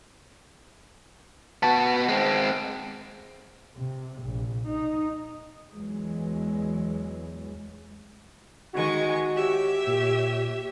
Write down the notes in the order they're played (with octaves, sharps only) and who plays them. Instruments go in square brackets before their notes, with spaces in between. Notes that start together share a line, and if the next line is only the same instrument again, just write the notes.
[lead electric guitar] B3 F#4 [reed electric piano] A5
[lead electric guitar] G#3 C4
[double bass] C3
A#1
D#4
[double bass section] E2 E3 F#3 G#3
[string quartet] D#3 G#3 C#6 [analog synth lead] F#4
[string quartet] G4 C#5 E5
[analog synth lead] A#2